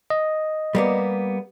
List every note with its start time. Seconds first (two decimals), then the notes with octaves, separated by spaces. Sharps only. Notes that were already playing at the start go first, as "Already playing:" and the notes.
0.10 D#5
0.75 G3 A#3 B3